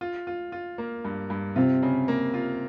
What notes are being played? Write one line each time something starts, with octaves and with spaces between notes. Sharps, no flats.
F4
F4
F4
A#3
G2
G2
C3 F4
C#3
A#3
F4